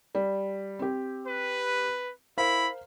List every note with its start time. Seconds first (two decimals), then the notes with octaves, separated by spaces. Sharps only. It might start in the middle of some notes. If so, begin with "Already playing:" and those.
0.15 G3
0.79 C4 G4
1.27 B4
2.38 E4 A#4 C5 F5 B5